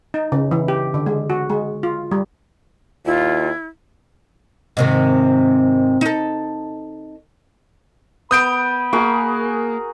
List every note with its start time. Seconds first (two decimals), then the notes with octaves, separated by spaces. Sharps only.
0.14 D#4
0.32 C#3
0.51 E3
0.68 G4
0.94 D3
1.06 G#3
1.30 F#4
1.50 G#3
1.83 F4
2.11 G3
3.06 D#2 E4 F4
4.77 G#2 C3 D#3
6.01 D#4 A4
8.31 B3 B5 D#6 G6 D7
8.93 A#3 F#4 G#4 A#4